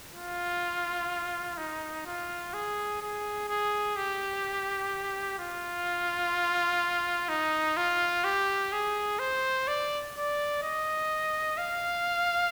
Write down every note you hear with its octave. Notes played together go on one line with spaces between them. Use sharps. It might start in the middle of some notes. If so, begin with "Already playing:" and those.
F4
D#4
F4
G#4
G#4
G#4
G4
F4
D#4
F4
G4
G#4
C5
D5
D5
D#5
F5